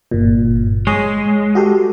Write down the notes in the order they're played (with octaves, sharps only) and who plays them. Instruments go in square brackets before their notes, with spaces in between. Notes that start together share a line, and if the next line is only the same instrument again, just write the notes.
[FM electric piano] G1 A#2
[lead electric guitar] G#3 [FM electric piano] G#4 C#5
[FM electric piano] F#4 G4 A4